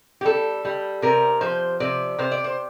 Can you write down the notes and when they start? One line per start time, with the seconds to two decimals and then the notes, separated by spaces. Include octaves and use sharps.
0.21 G4
0.25 G3 A4
0.65 G3
1.02 C3 A#4
1.41 F3 C5
1.80 C3 D5
2.18 C3 C5
2.32 D5
2.44 C5